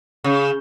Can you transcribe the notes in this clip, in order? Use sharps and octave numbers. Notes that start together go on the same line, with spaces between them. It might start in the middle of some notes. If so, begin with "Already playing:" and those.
C#3